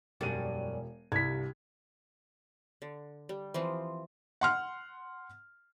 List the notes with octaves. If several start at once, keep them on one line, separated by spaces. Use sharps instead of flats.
E1 F#2 G3 D4 D#7
C2 G2 G#6 B6
D3
G3
E3 F3 C4
F#5 C6 F6